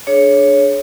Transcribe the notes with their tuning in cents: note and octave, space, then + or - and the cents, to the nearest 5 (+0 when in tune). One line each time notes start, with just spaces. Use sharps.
D4 +0 G#4 +30 C#5 +0